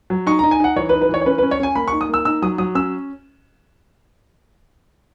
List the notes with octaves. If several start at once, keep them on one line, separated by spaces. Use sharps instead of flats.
F#3
D#4 C#6
A#5
D#4
G#5
D#4 F#5
E3 C#5
B4
D#4
B4
E3 C#5
C#5
C#4 B4
B4
C#4
C#5
C#4 G#5
A#3 B5
C#6
D#4
D#6
A#3 E6
D#4 E6
F#3 D#6
F#3 D#6
C#4 E6